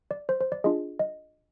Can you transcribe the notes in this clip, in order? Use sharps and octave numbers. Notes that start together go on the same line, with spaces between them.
D5
C5
C5
D5
D4 F4 G#4 D#5
D#5